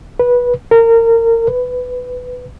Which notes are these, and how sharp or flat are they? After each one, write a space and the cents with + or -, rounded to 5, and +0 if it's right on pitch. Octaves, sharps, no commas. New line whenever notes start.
B4 -15
A#4 -25
B4 +15